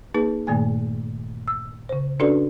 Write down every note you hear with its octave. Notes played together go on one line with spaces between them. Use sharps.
A#3 D#4 G#4 B4
G2 A#2 D#3 A3 A#3 G#5
E6
C#3 C5
C#4 D4 F#4 A4 B4 D5